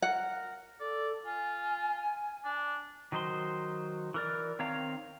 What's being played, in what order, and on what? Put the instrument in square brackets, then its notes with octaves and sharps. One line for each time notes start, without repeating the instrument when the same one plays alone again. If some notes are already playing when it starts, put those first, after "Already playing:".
[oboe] A#4 [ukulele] F#5
[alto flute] A4 [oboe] D5
[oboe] F4 [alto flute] G#5
[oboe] D4
[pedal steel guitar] D#3 F#3 D#4 C5 C6
E3 A#4 D5
D#3 C4 C#5 F5 A#5